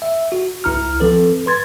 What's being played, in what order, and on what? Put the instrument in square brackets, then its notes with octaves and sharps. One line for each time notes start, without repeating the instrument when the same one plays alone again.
[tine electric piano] E5
F#4
C#2 E4 A#5 F6
F3 C4 A4 B4
B4 C6 G#6 A6